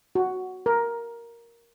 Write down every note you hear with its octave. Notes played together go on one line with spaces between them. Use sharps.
F#4
A#4